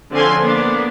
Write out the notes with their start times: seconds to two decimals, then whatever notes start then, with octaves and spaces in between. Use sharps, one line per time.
0.11 D3 F3 C4 C#4 G#5 C6
0.41 A#3 B3 D4